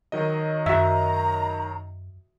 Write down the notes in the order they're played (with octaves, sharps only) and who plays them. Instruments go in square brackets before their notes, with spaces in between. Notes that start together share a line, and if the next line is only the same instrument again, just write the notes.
[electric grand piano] D#3 F#3 D#5
[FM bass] F#2 [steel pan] F#4 E5 [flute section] A#5